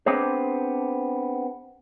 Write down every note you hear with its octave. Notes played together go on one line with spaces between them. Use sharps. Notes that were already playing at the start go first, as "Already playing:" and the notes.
B3 C4 D4 G#4 C5